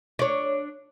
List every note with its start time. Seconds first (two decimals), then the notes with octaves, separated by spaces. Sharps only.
0.19 D4 C#5